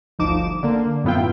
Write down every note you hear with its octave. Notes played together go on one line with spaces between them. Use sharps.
G1 D2 F3 D#4 D6 E7
D3 A#3
F#2 A2 B3 E4 F4 G5